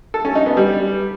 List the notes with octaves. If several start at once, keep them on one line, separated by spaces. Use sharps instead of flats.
A4
C#4
D#4
B3
G3